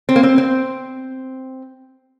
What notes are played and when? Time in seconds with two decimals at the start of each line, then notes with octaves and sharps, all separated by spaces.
0.09 C4
0.16 A#3
0.23 C4
0.38 C4